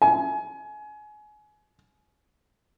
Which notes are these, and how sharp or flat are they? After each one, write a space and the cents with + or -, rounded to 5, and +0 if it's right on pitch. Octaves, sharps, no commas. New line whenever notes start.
G#5 +25